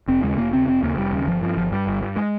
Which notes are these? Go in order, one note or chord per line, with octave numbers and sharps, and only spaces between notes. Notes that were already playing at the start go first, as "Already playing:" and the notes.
F1 C4
D#2 C#3 G#3
F1 A#3
D#2 C#3 C4
F1 C4
D#2 C#3 A#3
F1 G3
D#2 C#3
G1 F3
G2 F3
G1 F3
G2 G3
G1
G2
G#3